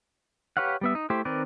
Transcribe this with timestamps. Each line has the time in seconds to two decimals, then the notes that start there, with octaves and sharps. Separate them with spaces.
0.57 G4 B4 C#5 F5 F#5
0.81 G3 B3 E5
0.95 D#4
1.10 A3 E4 G4 C5
1.25 D#3 C4 A#4 B4 D5